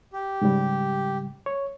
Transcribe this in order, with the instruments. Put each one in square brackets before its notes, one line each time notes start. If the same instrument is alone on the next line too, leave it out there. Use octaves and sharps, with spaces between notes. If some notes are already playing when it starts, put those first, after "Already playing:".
[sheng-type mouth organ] G4
[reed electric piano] G#2 C#3 G3
C#5